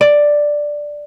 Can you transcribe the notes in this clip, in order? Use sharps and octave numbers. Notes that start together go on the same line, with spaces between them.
D5